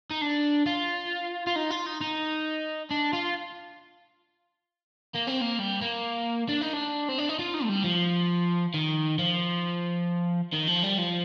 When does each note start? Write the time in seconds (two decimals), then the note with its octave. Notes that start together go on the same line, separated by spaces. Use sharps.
0.11 D#4
0.21 D4
0.66 F4
1.47 F4
1.56 D#4
1.70 F4
1.86 D#4
2.01 D#4
2.91 D4
3.13 F4
5.15 A#3
5.28 C4
5.42 A#3
5.60 G3
5.82 A#3
6.49 D4
6.62 D#4
6.73 D4
7.09 C4
7.18 D4
7.29 D#4
7.39 F4
7.54 D#4
7.64 A3
7.69 G3
7.84 F3
8.74 D#3
9.19 F3
10.53 D#3
10.68 F3
10.83 G3
10.98 F3